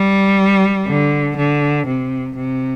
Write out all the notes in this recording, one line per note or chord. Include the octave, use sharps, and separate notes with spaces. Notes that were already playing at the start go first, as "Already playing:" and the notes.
Already playing: G3
D3
D3
C3
C3